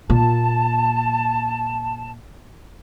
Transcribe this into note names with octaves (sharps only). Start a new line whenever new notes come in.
A#2 A5